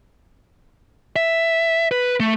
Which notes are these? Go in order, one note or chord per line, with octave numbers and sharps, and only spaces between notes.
E5
B4
A3